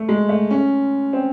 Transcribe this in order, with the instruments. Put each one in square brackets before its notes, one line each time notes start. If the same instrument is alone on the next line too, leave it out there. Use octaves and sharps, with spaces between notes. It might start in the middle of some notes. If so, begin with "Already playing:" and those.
Already playing: [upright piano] A3
G#3
A3
C#4
C4